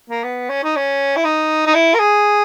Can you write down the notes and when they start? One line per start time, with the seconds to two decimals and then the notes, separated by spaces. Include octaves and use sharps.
0.10 A#3
0.24 B3
0.49 C#4
0.63 D#4
0.76 C#4
1.16 E4
1.24 D#4
1.67 D#4
1.74 E4
1.94 A#4
2.00 G#4